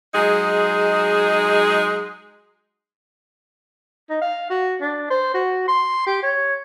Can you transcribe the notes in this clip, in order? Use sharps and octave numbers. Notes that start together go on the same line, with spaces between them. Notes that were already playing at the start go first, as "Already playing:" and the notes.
F#3 G#3 D#4 G#4
D#4
F5
F#4
D4
C5
F#4
C6
G4
C#5